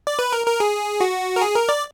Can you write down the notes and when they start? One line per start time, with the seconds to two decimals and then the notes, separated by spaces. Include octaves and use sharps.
0.07 D5
0.19 B4
0.33 A#4
0.46 A#4
0.60 G#4
1.01 F#4
1.36 A#4
1.41 G#4
1.56 A#4
1.69 D5